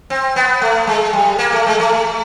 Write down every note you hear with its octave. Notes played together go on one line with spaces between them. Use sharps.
C4
B3
A3
G#3
G3
A#3
A3
G#3
A3